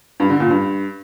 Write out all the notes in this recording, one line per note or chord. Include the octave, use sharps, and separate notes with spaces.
G2
D3
A#2
G2